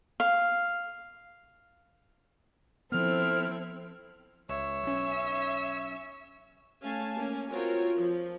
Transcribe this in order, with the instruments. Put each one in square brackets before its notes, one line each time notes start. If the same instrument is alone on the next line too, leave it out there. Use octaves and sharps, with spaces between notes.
[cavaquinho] F5
[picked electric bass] F3 B3 [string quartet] C4 E4 A4 [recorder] F6
[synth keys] C#2 [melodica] C#5 [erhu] E5
[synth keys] B1 C#4
[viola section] A3 C#4 F5 G#5 A5
A#3 C#4
C4 F4 F#4 A#4 C#5
F3